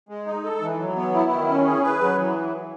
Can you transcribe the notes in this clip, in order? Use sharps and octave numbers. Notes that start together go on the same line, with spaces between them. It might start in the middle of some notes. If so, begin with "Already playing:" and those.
G#3
D#4
A4
E3
F#3
B3
E4
D#3
C#4
G#4
B4
F#3
E3